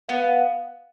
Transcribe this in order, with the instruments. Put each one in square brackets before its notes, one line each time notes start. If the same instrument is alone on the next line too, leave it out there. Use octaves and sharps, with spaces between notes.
[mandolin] B3 [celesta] F5
[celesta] F5